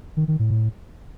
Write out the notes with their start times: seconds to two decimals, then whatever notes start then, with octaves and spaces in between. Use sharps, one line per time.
0.17 D#3
0.28 D#3
0.39 A2
0.50 A2